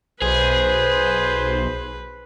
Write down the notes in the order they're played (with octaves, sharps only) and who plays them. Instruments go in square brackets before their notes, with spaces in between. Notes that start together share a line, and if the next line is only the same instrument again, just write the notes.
[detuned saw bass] B1 [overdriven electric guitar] G#4 [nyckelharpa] B4 [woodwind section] C5